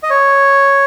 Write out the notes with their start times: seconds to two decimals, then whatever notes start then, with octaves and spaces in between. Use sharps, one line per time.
0.03 D#5
0.10 C#5